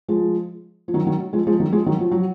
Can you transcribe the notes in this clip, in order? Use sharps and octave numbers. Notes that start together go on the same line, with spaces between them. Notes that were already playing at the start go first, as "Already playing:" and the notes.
F3 G#3
F3
D#3 F#3
D#3 F#3
F3 G#3
F3 G#3
D#3 F#3
F3 G#3
D#3 F#3
F3
F#3